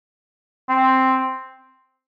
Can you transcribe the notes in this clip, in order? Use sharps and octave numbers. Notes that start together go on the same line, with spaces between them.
C4